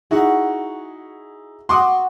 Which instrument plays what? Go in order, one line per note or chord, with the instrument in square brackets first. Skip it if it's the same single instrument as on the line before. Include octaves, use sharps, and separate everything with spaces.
[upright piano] D#4 E4 G#4 [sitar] F#4
[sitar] F#4 [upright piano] C6 D6 D#6